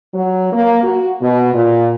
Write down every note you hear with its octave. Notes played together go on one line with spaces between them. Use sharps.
F#3
A#3
F#4
B2
A#2